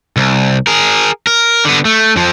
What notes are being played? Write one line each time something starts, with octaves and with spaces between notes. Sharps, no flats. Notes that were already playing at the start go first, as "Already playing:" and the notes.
C2
G#4 A#4
A#4
D3 B3
A3
F2 F3